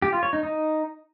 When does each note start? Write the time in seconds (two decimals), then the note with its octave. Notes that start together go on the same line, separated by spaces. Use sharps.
0.02 G4
0.13 F4
0.23 C#5
0.33 D#4
0.43 D#4